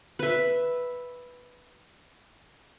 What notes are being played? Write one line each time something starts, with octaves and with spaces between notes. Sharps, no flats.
B4 E5